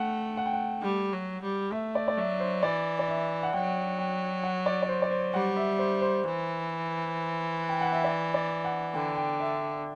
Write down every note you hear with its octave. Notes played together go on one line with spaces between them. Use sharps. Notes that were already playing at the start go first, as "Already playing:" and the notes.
Already playing: A3 F#5 G5
F#5
G5
F#5
G3
F#3
G3
A3 E5
D5
D5
F#3 E5
C5
E3 D5
D5
E5
F#5
F#3 G5
G5
F#5
D5
D5
C5
D5
C5
G3 F#5
E5
C5
C5
E3
G5
F#5
E5
D5
D5
F#5
D3 G5
G5
E5